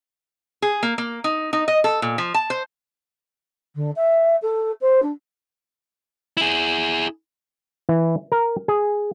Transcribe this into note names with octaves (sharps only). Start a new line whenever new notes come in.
G#4
A#3
A#3
D#4
D#4
D#5
A4
A#2
F3
A5
C5
D3
E5
A4
C5
D4
E4 G#4
E3
A#4
G#4